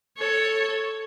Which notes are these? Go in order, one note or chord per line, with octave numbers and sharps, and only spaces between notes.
A4 C#5